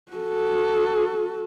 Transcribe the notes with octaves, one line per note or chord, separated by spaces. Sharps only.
F#4 A4